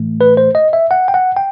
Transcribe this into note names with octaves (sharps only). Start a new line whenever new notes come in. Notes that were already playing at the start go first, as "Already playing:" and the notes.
Already playing: A2 E3 A3
B4
C5
D#5
E5
F#5
G5
F#5
G5